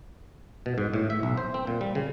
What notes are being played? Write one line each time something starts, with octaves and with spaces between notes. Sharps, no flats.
B2
G#2
A2
E5
B1
C5
C4
A#2
G3
C#3